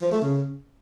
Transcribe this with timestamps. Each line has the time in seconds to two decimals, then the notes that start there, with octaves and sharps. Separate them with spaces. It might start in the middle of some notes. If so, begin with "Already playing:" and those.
0.02 F3
0.12 A3
0.22 C#3